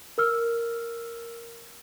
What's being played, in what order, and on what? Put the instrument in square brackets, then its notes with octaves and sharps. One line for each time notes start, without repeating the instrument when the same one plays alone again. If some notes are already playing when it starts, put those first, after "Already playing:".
[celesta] A#4 E6 F6